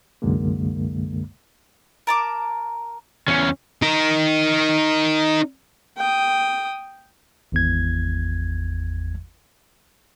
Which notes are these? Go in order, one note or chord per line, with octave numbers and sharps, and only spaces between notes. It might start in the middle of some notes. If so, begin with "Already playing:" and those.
C2 F#2 D3 G#3 A#3
A#4 A5 D6
E2 C#4
D#4 A#4
G5 D#6
G#1 E2 G#6